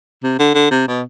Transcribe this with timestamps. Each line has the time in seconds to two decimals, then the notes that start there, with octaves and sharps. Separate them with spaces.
0.23 C3
0.39 D3
0.55 D3
0.71 C3
0.88 B2